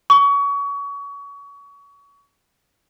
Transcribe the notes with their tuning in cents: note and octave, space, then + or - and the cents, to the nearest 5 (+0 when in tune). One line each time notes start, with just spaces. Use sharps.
C#6 +30